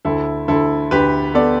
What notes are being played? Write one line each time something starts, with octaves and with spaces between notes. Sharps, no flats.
D2 E4 A4
D2 E4 A4
D2 G4 B4
B3 A4 D5